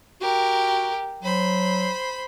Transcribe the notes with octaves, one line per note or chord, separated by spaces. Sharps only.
F#4 G4 A#4
F#3 C5 B5